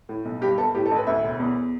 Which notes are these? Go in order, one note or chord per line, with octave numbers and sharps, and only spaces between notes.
A2
B1
G2 G4
G1 A4
A2 G4
A4
A1
B4
D2 E5
E1
E2